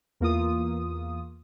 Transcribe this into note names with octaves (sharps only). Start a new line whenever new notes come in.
E2 A#3 F4 D#6